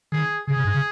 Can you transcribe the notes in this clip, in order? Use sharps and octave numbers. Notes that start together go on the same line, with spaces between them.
D#3 G#4
C#3 G#4
C3
G2
C#3